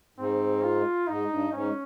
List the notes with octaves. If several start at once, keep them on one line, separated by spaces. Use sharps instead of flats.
G#2 C4
F4
G#2 D#4
G2
G#2 C#4